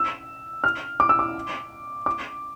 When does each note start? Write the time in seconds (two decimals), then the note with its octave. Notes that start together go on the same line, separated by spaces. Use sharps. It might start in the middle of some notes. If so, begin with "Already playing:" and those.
Already playing: E6
0.64 F6
1.00 D6
1.09 E6
1.19 D6
2.06 D6